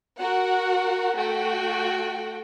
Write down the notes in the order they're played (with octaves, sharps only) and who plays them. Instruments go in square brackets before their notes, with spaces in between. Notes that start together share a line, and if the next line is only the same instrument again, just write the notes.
[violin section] F#4 A#4 F#5
A3 F#4 G5